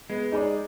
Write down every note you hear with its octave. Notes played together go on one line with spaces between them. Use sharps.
G#3 B3
D#4 G#4 D5